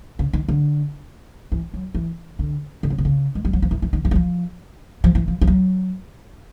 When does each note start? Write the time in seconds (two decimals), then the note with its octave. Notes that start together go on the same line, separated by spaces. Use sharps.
0.19 C#3
0.33 D#3
0.49 D3
1.52 E3
1.74 F#3
1.95 E3
2.39 D3
2.83 D3
2.90 C#3
2.98 C3
3.05 C#3
3.35 G#3
3.45 G3
3.53 F#3
3.62 F3
3.71 E3
3.82 E3
3.93 D#3
4.05 E3
4.11 F#3
4.16 F3
5.04 F3
5.15 E3
5.28 F3
5.41 F3
5.47 F#3